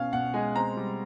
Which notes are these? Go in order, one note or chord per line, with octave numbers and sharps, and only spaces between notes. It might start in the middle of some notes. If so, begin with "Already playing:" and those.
Already playing: B2 C#4 F5
B2 F#5
G#3 G#5
C4 A#5
G3